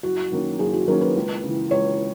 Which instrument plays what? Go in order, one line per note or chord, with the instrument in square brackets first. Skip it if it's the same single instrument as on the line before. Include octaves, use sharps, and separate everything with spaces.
[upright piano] F#1 [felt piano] F#4
[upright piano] F#2 D#3 A#3 C#4
[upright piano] F#1 [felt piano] G#4
[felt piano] F#4
[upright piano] F#2 D#3 A#3 C#4 [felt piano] A#4
[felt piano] B4
[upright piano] C#2
C#3 E3
[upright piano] C#2 [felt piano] C#5